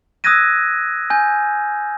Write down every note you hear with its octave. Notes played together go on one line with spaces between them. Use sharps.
D#6 E6 F#6 G#6 A#6 D#7
G#5 G6